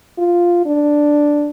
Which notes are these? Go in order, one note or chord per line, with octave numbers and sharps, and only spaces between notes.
F4
D4